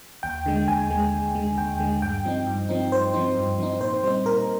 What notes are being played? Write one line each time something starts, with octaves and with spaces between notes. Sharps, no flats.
D#2 G5
D3 G#3
D#2 G#5
D3 G#3
D#2
D3 G#3
D#2 G5
D3 G#3
G2 G5
F3 C4 D#4
G2
F3 C4 D#4
G2 C5
F3 C4 D#4
G2
F3 C4 D#4
A#2 C5
G3 C4 D#4 C5
A#2 A#4